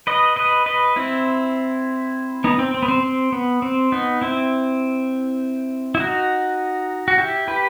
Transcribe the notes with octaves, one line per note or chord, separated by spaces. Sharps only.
B4 D#5
B4 D#5
B4 D#5
C4 E4
B3 D#4
C4
C4
B3
C4
C4
B3
C4
B3 D#4
C4 E4
E4
D#4 F#4
F#4
E4 G4
G4 B4